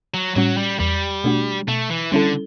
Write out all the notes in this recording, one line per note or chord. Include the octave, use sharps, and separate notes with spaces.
F#3
A2 F#3 G3 C#4 F#4
G3
E2 G3
B2 A3 D4 F#4
B2 A3
E3
D3 G3 C#4 E4 A4